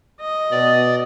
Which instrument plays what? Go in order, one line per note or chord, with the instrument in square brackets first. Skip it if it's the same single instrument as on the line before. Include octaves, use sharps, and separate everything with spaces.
[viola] D#5
[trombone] B2 [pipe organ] D5